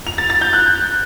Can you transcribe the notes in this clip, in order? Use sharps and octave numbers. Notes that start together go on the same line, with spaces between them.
F7
A6
A6
G6
F#6